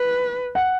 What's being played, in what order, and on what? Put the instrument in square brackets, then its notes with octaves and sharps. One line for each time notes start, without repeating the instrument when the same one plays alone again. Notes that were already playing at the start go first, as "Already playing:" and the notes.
Already playing: [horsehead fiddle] B4
[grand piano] F#5